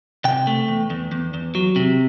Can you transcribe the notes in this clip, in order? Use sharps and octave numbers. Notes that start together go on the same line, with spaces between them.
C3 G5
A3
E2
E2
E2
E2
F#3
C3